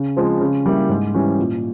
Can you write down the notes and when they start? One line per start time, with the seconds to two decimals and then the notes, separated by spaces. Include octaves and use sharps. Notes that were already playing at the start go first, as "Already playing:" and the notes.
Already playing: C#3
0.17 F3 G#3 C4
0.41 C#3
0.66 G3 A#3 E4 G4
0.89 G#2
1.14 E3 G3 C#4
1.39 A#2